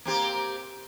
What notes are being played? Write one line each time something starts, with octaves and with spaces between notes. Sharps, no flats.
A#3 C4 G4